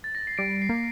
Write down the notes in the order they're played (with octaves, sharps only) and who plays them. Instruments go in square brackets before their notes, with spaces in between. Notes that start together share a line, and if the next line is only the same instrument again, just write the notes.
[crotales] A6
A#6
C7
[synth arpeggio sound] G3 [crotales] D7
[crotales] C7
[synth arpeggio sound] A#3